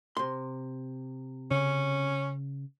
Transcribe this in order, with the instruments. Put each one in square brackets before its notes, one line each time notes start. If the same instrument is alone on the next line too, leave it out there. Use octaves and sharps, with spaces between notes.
[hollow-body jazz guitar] C3 C6
[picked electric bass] C#3 [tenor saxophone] C#4